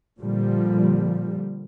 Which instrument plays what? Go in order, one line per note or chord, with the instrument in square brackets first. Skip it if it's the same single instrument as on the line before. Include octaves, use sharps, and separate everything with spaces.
[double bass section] A#2 D3 F3 G3